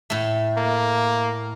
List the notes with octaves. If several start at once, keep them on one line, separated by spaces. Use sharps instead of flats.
A2 A3
A#3